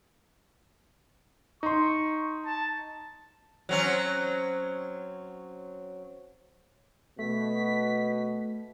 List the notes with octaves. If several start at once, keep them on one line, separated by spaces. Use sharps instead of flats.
D#4 C6 C#6
A5
F#3 C4 C#4
B2 A3 B6